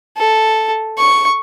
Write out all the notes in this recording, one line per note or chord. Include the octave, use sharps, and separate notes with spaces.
A4
C#6